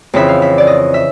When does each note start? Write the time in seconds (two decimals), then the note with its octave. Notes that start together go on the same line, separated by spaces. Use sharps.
0.14 F2 C#3 E3 E5
0.28 F5
0.42 E5
0.58 D5
0.67 D#5
0.94 E5